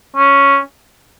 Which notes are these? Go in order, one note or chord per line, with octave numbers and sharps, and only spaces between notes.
C#4